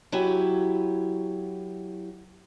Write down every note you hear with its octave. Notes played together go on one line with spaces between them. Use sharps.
F#3 E4 G4 G#5